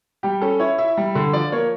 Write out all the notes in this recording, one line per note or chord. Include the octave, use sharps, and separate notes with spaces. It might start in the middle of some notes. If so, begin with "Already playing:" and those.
G3 G4
C#4 A4
E4 C#5
E4 E5
G3
D3
F3 D5
A#3 C#5